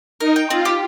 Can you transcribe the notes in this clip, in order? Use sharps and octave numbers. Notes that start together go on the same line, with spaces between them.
D#4 A#4
G5
C4 F4
G4